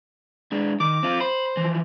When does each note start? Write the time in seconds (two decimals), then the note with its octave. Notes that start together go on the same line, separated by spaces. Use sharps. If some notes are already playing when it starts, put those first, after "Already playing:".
0.52 G#3 D4
0.80 D#3 D6
1.03 C4 F4
1.20 C5 B5
1.57 E3 F3